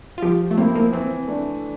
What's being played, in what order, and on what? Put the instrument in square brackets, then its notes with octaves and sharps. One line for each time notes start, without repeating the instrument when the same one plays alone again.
[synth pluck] F4
[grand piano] F3 [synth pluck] G4
[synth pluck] A3
[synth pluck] A#3 [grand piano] C4 E4
[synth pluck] A#3
[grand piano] E3 [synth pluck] C4
[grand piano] A3 D4